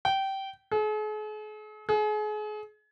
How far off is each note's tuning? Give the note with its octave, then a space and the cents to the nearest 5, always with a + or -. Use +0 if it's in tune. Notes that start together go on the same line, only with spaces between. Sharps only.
G5 -20
G#4 +45
G#4 +35